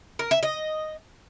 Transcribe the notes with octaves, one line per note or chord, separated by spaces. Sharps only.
A#4
E5
D#5